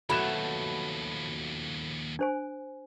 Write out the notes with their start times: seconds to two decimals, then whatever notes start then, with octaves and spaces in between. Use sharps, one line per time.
0.09 D#2 B2 F3 F#3 A3 B5 E7
2.19 D4 C5 G#5